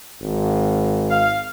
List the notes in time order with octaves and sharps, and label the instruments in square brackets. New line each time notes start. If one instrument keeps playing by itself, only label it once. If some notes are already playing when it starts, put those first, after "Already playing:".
[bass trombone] G#1
[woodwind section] F5